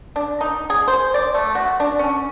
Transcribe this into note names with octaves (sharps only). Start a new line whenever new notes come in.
D4
D#4
G#4
C5
D5
A3
F#4
D4
C#4